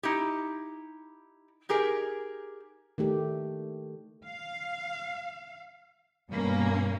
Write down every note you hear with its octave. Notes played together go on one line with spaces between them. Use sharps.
D#4 E4 G4
D#4 G4 G#4 A#4
D#3 A3 G4
F5
G2 B2 A#3 C#4